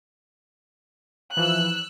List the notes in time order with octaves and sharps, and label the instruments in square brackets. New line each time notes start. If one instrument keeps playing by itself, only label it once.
[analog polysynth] E3 F3 [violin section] E6 F#6